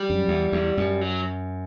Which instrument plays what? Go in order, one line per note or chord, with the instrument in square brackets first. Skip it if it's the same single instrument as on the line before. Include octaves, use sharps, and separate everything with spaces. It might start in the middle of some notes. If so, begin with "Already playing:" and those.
Already playing: [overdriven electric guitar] G3
[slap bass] F#2
E2
E2
F#2
[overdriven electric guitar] F#3